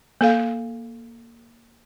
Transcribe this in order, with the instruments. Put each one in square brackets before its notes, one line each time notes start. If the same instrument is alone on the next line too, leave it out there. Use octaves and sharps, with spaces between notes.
[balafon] A#3 A4 F5